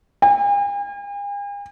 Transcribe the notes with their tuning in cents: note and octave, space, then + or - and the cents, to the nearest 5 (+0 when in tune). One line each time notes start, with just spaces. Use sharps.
G#5 -45